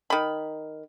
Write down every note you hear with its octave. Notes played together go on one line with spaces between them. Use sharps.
D#3 B5